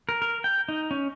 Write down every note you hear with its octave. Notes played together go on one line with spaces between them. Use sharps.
A#4
A#4
G5
D#4
C#4